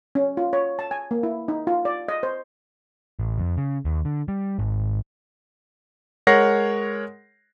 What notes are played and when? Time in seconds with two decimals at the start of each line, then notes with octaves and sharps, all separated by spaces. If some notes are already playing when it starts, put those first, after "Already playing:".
0.15 C#4
0.37 F4
0.53 C#5
0.79 A5
0.91 G#5
1.11 A#3
1.23 E4
1.48 D#4
1.67 F4
1.85 D5
2.08 D#5
2.23 C5
3.19 A1
3.38 F2
3.57 C#3
3.85 D#2
4.05 D3
4.28 G3
4.59 G#1
6.27 G#3 A#4 C#5 F#5 A#6 C7